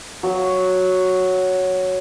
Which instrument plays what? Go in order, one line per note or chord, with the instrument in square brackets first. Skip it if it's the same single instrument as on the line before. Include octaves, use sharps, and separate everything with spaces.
[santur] F#3 D#6